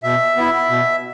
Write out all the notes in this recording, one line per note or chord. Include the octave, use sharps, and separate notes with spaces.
B2 E5
B3 E4
B2